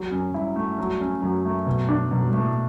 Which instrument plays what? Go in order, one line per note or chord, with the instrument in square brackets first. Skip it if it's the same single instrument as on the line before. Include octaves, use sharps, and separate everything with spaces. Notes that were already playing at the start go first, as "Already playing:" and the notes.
Already playing: [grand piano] F#3
[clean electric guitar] F#2 [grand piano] C#4
[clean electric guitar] G2 [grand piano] E4
[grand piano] A3
F#3
C#4
[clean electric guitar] F#2 [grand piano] F#3
[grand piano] A3
B2
D4
[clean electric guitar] F#2 [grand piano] B2
[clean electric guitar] G2
[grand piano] A3
[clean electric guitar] A2